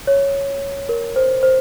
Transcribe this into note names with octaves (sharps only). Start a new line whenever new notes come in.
C#5
A#4
C5
C5